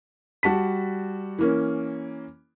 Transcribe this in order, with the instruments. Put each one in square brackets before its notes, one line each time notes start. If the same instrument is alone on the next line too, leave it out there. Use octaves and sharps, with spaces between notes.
[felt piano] G3 F#4 A5 B6
E3 A#3 C#4